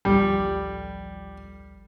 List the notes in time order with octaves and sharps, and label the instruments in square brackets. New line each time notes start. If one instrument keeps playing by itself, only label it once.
[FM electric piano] A1 D2 F3 [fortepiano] G3